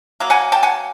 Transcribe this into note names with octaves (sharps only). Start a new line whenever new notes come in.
F#3 A#3
F#5 G#5
G5 A5
F#5 G#5